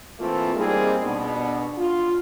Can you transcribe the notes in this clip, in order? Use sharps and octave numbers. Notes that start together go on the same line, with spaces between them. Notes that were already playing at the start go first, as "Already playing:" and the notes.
E3 A3 A#3 C4 F4
G3 G#3 A#3 C4 D#4 G#4
B2 B3 D4
F4